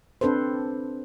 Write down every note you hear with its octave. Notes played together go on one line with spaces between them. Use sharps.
C4 D4 A4 B4 C5